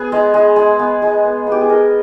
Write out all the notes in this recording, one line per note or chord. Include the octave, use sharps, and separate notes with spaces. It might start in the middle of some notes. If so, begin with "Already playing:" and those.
Already playing: B3 G#4
G#3
G#3
G#3
B3
G#3
B3
B3 G4
G#4
G#3 A#4